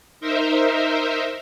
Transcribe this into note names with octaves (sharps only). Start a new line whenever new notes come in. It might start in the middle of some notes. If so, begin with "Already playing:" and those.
D#4 A#4 C5 E5